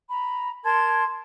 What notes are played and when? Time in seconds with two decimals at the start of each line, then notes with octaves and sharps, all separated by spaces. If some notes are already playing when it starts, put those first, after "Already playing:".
0.09 A#5 B5
0.64 A#4 A5 C6 G#6